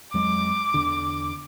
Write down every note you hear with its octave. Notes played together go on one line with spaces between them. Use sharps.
F2 F#3 G#3 D6
E2 D3